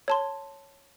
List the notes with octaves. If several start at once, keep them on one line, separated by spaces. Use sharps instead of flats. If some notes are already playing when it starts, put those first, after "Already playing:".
C#5 A5 C6